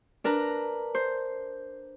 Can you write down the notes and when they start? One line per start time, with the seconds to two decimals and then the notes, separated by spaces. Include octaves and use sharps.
0.24 D4 A#4 B4 A#5
0.95 C5